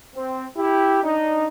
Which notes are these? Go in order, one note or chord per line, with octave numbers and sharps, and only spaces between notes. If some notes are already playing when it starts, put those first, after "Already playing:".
C4
E4 G4
D4 D#4